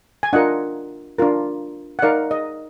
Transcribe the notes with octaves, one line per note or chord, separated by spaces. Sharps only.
G#5
D4 F4 A#4 D#5 F#5
D4 F4 A#4
F#5
D#4 A#4 D5 F5
D#5